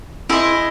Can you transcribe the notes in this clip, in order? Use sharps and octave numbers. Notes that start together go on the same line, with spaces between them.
E4 G#4 C5 D#5